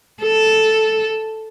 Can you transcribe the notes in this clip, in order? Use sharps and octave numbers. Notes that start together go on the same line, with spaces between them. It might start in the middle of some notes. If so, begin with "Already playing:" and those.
A4